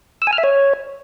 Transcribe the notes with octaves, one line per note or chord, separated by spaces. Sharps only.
E6
G#5
F6
E5
C#5